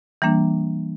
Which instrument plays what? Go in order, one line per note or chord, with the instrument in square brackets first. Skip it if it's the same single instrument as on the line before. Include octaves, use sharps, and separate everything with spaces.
[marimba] E3 G3 A#3 D4